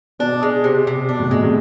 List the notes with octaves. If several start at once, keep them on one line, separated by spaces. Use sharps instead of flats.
B2 D4
G#3
C3
C3
B2 D4
A2 C3
B2 G#3
A2 C3